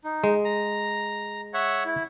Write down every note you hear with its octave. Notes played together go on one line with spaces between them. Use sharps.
D#4
G#3
A#5
C#5 E5 F#5
E4